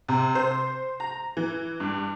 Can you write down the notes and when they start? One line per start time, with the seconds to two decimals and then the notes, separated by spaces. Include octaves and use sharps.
0.08 C3
0.35 C5
1.00 A#5
1.37 E3
1.80 G2